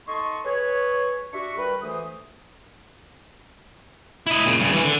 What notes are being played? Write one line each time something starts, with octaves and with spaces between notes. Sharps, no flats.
D#4 A4 D#5 A5 C6 C#6
G#4 B4 C#5
D4 F#4 G4 E5 C#6
G3 A#4 B4
D2 E3 A3 C5 D#6
E4 D#5
A#2 C#3
G2 C#3
E3 C#4
D3